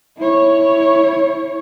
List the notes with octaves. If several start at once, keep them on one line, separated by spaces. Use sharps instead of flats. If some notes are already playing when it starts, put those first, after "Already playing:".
E4 C#5